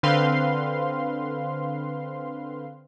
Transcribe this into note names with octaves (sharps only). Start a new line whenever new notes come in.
D3 C4 B4 F5 C6